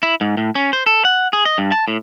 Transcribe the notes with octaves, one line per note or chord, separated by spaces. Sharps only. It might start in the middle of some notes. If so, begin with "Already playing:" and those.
E4
G#2
A2
C#4
C5
A4
F#5
G#4
D#5
G2
A5
A2